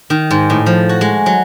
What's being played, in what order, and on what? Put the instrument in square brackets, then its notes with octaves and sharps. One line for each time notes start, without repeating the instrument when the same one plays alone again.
[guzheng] D#3
G#2
A2
F3
F#4
G#3
F#3